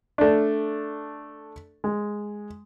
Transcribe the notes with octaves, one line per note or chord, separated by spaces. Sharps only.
A3 D4
G#3